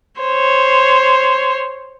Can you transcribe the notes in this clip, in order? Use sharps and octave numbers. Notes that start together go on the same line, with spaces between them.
C5 C#5